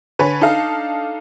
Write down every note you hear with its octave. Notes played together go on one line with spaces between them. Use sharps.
D3 B4 C#5 G#5
D4 D#4 A4 F5